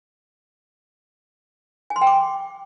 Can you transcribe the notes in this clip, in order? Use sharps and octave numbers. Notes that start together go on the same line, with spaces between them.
G#5
C6
G5
D6